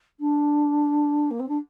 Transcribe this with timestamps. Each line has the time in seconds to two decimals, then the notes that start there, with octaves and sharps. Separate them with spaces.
0.20 D4
1.30 A#3
1.39 C4
1.48 D4